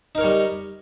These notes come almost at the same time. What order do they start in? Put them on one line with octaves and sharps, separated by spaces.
D#4 A#4 C#5 G3